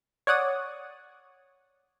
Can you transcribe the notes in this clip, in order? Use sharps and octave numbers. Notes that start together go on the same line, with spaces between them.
C#5 D5 F#5 D#6